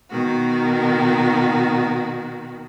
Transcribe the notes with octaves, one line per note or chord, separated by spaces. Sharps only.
B2 D#3 F#4